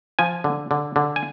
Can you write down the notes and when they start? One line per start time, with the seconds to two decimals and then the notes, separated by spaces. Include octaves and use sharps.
0.19 F3 G#5
0.44 D3
0.71 D3
0.96 D3
1.16 G#5